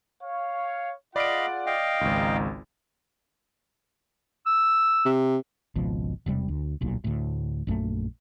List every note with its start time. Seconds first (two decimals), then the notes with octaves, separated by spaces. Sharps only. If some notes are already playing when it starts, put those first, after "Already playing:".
0.23 C#5 F5
1.16 F4 G#4 D5 D#5 F5 F#5 B5 D7
1.66 D#5 F5 G5
2.01 G#1 C#2 D#4
4.46 E6
5.06 C3
5.76 G#1 C#2 B2 F3
6.26 E1 C3 G3
6.48 D2
6.81 D1 B1 A#2
7.04 D2 A2
7.67 A#1 F#2 D#3 A3